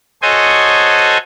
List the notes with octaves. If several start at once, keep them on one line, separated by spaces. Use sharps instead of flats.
F#4 A4 C5 C#5 D#5 G#5